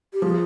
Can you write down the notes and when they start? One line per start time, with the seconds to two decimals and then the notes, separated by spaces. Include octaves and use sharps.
0.13 G4
0.22 F3 G#4